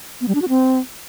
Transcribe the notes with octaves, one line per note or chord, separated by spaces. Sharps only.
B3
G3
D4
F#4
C4